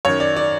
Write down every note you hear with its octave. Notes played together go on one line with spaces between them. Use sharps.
F#2 D#3 C#5
D5
D5